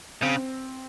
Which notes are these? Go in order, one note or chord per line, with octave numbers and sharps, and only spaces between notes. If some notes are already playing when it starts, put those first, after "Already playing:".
C#3 C4